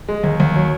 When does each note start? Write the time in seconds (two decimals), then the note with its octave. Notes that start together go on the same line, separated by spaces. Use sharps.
0.08 G#3
0.24 D#2
0.40 D#2
0.56 F#3